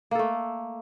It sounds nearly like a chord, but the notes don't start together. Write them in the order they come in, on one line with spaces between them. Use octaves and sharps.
A#3 A4 A3